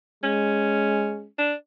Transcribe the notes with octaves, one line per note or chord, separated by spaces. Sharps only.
G#3 C#4
D4